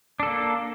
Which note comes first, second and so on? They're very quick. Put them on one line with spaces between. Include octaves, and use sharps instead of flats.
D4 A4 A#3